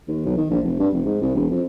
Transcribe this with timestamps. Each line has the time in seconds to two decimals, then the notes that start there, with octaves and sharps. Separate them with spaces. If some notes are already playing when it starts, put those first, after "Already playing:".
0.08 D#2
0.25 B1
0.37 D#3
0.50 A#1
0.64 F1
0.79 G2
0.93 F1
1.05 G#2
1.22 C2
1.35 E1
1.51 F2